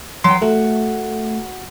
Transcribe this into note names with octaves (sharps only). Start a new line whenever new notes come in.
F#3 G5 C6
A3 F#4